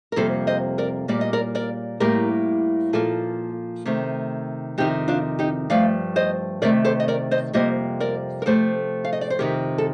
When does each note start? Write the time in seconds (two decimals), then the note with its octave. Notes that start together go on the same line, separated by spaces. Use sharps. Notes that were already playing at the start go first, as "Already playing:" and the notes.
0.12 A#4
0.16 F2 C3 G3 A#3 A4 C5
0.47 C5 D#5
0.78 A#4 D5
1.08 A#2 G3 A#3 D5
1.21 D#5
1.33 A#4 D5
1.55 A#4 D5
2.00 A2 G3 A#3 G4 A#4
2.93 A#2 F3 A#3 F4 A4
3.85 C3 D#3 A3
4.78 F2 C3 D#3 D#4 G4
5.08 D4 F4
5.39 D#4 G4
5.70 G2 F3 A3 D5 F5
6.16 C5 D#5
6.62 C3 D#3 A3 A#4 D5
6.84 A4 C5
7.00 D#5
7.08 A#4 D5
7.31 C5 D#5
7.53 F2 C3 G3 A#3 C5 D#5
8.00 A#4 D5
8.42 A#4
8.46 C3 F3 A3 A4 C5
9.05 F5
9.13 D#5
9.21 D5
9.30 C5
9.39 F2 C3 D#3 G4 A#4
9.78 A4